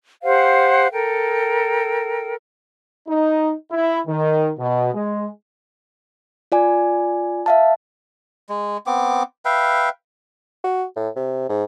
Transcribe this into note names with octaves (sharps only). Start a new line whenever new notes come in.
G4 C5 F5 F#5
A4 A#4 G5
D#4
E4
D#3
B2
G#3
F4 D5 G#5
E5 F5 A5
G#3
B3 C4 D6
B4 E5 F5 G5
F#4
A2
C3
G#2